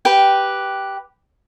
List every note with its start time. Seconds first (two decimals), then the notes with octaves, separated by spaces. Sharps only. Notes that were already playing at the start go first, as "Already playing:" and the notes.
0.05 G4 B4 G5